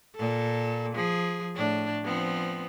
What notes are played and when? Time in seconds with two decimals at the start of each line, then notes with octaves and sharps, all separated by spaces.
0.16 A#2 A4
0.94 F3 G#4
1.55 A2 D4
2.04 F3 B3 C4